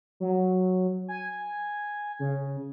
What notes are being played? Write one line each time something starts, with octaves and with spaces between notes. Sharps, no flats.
F#3
G#5
C#3